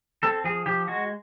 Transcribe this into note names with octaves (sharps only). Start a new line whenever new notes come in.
C4 A4
F3 G#4
F3 G4
G#3 F#4